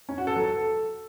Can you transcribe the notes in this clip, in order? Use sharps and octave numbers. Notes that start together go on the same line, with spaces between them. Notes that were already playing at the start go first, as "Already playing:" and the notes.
C#4
F#4
A4
F#3
A4